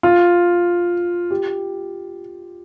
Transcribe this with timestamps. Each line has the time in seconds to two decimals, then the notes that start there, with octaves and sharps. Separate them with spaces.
0.03 F4
1.31 G4